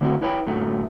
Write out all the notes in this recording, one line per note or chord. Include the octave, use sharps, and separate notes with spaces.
D3 A3 C4 E4 F#4
E4 B4 C#5 G5 A5 B5
F#2 A2 D3 F#3 A3